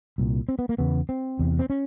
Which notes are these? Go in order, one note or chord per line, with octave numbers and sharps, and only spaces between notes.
C2 A#2
C4
B3
A#3
E2 C#3 B3
C4
E2 C3
C4
C#4